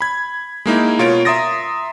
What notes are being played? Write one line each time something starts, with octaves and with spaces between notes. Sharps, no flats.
B5 G#6
G#3 A#3 D#4 E4
B2 F4 A#4 C#5 D7
E5 A#5 C6 D#6 A6 A#6